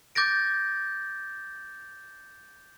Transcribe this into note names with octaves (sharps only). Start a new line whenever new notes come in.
D6 G6 A6 A#6 D7